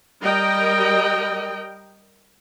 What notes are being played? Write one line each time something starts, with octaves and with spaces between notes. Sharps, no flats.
G3 A#4 D#5 G5